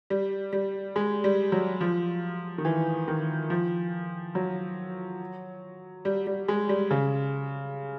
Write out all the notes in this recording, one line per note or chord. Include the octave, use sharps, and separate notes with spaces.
G3
G3
G#3
G3
F#3
F3
D#3
E3
D#3
F3
F#3
G3
G3
G#3
G3
C#3